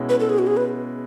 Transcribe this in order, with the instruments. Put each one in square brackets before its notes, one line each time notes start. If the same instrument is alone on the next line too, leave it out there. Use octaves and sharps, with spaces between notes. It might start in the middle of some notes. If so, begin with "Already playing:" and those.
Already playing: [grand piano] B2 G#3 C#4 E4
[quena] B4
A4
G#4
F#4
G#4
B4